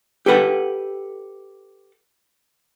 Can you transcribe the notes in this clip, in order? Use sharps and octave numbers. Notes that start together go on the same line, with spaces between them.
G4 A4 B4 F#5